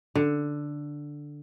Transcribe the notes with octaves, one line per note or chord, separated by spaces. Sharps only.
D3